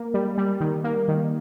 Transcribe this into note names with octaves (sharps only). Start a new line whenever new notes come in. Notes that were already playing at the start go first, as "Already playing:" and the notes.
Already playing: A#3
G3
G3
D#3
A#3
D#3